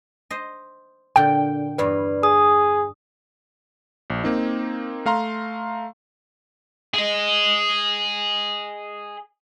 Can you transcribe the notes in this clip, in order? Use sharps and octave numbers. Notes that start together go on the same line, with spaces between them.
C5 D#5
A#2 D3 G5
E2 G2 B4 D5
G#4 D#6
A#1
A#3 C4 D#4
A3 F5 A#5 C6
G#4 D#5